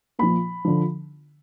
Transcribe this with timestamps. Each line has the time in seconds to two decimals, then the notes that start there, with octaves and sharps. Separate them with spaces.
0.19 A#2 F3 B5
0.65 D3 F3